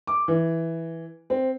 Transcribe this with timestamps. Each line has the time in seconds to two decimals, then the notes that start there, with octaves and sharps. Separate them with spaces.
0.07 D6
0.28 E3
1.30 C4